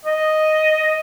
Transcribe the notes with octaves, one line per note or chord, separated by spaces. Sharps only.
D#5